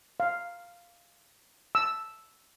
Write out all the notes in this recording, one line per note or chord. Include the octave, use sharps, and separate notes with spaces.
F5
E6